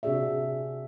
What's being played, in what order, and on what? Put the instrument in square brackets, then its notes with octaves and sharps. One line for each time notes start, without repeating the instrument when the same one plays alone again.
[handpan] C3 D4 F#4 G#4 D5 E5